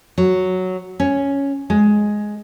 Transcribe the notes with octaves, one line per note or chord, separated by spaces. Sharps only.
F#3
C#4
G#3